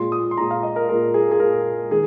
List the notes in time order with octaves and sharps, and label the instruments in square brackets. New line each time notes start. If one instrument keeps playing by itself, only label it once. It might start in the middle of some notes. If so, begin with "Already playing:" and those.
Already playing: [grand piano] A#2 G#3 F4 C6
D#6
C6
A#2 G#3 F4 A#5
F5
D#5
A#4
A#2 G#3 F4 A#4
G#4
G#4
A#2 G#3 F4 A#4
D#3 G#3 G#4